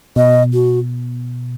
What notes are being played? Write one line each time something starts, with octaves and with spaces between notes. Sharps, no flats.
B2 D#5
F#4